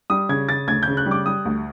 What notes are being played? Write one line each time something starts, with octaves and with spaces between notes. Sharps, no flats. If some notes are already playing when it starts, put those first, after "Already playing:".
G3 D#6
C#3 G#6
C#3 A6
D2 G#6
C#3 G6
F#6
G3
D6
G3 D#6
D2